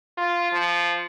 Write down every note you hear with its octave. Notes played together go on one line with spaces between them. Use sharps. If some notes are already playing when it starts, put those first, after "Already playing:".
F4
F3